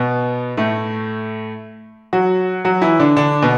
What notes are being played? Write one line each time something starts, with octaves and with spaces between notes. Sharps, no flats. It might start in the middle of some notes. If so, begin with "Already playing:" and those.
Already playing: B2 B3
A2 A3
F#3 F#4
F#3 F#4
E3 E4
D3 D4
D3 D4
B2 B3